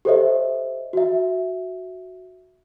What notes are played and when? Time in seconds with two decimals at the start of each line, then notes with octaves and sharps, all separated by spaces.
0.05 G4 A4 C5 C#5 D#5 E5
0.93 F#4 E5